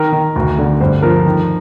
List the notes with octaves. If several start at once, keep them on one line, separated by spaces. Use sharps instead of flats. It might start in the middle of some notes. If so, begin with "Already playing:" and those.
Already playing: D#3 A#4
D#3
D2
D3
G2 C5
F3 A#4
D#3